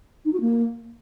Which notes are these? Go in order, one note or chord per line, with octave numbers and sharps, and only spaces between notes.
D#4
F#4
A#3